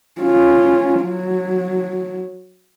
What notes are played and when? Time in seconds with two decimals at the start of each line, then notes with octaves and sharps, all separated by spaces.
0.21 C#4 F4
1.01 F#3